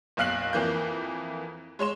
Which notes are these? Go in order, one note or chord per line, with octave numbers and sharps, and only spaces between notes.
F#1 B1 F5 F#6 C7 F#7
F2 E3 A#3 G6
G#3 C#5 C6 E7